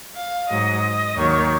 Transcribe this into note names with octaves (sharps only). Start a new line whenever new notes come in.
F5
G#2 F#3 D#5
D#2 D#3 F#3 C#5